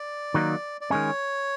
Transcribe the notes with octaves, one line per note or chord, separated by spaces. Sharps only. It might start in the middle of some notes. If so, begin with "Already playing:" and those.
Already playing: D5
D#3 F#3 A#3 D#4
D5
D#3 G#3 C#4 C#5